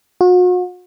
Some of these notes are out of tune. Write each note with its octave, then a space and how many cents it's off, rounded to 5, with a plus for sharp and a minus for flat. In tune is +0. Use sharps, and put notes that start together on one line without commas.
F#4 -40